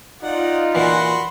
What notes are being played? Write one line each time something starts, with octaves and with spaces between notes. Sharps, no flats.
D#4 F4 D5 D#5 F#5
A#2 E3 F#4 F#5 B5 C6